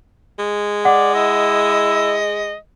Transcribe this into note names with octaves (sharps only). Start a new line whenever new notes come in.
G#3
D5 F#5
E4 D#5